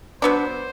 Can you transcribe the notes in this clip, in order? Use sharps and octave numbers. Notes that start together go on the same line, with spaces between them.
F#3 B3 D4 C5